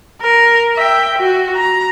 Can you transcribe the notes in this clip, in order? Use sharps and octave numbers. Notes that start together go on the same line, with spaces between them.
A#4
E5 G5
F#4
A#5